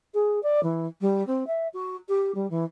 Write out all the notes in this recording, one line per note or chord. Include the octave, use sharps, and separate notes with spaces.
G#4
D5
E3
G3
C4
E5
F#4
G4
G3
E3